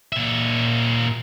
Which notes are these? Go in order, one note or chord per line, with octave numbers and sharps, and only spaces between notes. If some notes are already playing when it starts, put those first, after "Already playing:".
A#2 E5